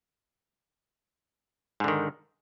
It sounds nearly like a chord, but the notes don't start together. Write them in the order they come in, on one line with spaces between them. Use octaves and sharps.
G#2 D3 D#3